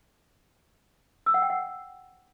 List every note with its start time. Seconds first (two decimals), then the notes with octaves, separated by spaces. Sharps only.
1.26 E6
1.34 F#5
1.42 G5
1.50 F#5